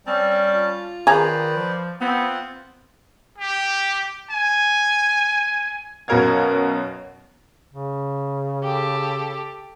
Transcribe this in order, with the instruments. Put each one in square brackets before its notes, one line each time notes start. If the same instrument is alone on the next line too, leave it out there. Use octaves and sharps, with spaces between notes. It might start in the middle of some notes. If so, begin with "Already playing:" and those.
[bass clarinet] G3 [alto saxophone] C4 [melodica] C#4 A5
[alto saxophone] F4
[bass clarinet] D#3 [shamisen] G#4 A#5 [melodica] B4 C5 D5
[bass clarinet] F3
[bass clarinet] B3 [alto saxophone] C4 [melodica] F4 F#5
[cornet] G4
G#5
[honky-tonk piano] F#2 B2 F#4 A#4 F5 G#6
[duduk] C#3
[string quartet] G4 A4